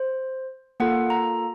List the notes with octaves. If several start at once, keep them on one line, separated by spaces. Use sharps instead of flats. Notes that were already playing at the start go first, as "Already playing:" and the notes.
Already playing: C5
A#3 F4 A4 F#5
A#5